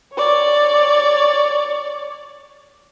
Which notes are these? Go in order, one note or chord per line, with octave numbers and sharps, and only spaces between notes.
C#5 D5